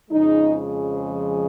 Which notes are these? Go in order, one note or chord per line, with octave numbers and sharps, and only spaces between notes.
F2 C#3 F3 G#3 D#4